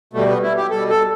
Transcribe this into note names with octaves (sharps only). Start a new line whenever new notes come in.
B2 G3 A3
B3
E4
G4
B2 G3 A4
A4